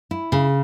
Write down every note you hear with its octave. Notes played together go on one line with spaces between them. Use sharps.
E4
C#3